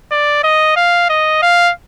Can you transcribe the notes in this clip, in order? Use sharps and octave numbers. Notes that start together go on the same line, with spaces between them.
D5
D#5
F5
D#5
F5